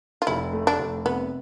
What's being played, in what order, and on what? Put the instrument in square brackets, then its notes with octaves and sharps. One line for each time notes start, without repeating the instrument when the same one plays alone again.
[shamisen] F4
[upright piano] F1 [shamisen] E4
[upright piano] A3
[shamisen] D4
[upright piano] F1
[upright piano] C3 [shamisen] B3